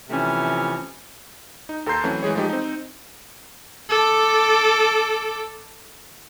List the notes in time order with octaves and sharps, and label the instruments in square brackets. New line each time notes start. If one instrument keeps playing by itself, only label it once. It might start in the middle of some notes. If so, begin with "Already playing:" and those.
[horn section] C3 E3 F3 A3 C#4
[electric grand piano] D#4
D#2 A4 A#5 C6 G6 C7
E3 F#3 A3 C4 C#4
E3 G#3 G#4 C#5
F3 G#3 A3 D#4 G4
C4 D#4
[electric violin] A4 D6